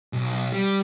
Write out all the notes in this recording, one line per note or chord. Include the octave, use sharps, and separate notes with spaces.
B1
G3